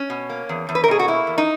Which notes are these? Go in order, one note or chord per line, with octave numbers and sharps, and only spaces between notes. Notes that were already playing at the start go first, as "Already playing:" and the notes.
Already playing: C#4
B2
A#3
E2
E2
B4
A#4
B2 G#4
F#4
A#3 E4
E2
D#4